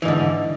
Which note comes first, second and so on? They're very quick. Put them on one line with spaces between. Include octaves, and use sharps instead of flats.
E3 G#2 D3